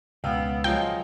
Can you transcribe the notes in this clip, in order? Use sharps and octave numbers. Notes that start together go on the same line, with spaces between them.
C#2 B2 B3 F5 G5 E6
F3 F#3 G#3 F4 G5